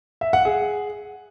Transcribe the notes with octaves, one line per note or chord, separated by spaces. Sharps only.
E5
F#5
G#4